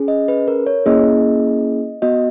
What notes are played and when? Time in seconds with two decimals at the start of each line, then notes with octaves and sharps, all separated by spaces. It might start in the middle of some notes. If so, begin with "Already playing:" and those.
Already playing: C#4 G#4
0.08 D#5
0.28 B4
0.48 A#4
0.66 C#5
0.86 A#3 C#4 E4 G#4 D#5
2.02 B3 F#4 D#5